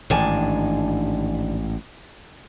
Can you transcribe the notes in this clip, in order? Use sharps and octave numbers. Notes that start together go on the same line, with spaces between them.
A1 G#2 D#3 D4 G#5